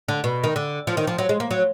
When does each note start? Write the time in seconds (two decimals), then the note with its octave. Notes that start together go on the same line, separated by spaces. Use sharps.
0.08 D3
0.24 B2
0.44 D#3
0.56 D3
0.87 F3
0.97 D#3
1.07 F3
1.18 F#3
1.29 G#3
1.40 A#3
1.51 F#3